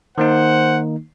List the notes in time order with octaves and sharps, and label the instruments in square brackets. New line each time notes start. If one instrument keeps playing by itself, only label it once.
[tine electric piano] D#3 A#3 D#4 [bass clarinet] C5 [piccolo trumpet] F#5